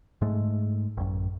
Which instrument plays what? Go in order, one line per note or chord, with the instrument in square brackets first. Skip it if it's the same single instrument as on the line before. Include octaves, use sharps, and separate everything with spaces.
[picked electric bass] G#2 G#3 A3
A1 F#2